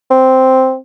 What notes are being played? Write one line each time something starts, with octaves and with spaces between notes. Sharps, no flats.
C4